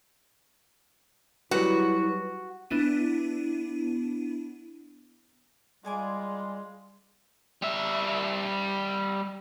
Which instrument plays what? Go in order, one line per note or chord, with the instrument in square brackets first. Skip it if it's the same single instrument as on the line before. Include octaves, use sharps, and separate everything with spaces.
[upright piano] F#3 G3 [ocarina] E4 [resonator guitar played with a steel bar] F#4 [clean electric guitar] B4
[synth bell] B3 D4 E4 D#7
[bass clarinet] G3 [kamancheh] G#3 F4 [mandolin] D5 G#5 D6
[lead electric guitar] G3 E5